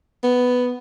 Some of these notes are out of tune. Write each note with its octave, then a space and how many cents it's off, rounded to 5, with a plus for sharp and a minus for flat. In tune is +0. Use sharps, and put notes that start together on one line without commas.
B3 +5